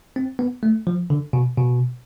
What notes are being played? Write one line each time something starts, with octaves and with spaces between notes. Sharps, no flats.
C4
B3
A3
F3
D3
B2
B2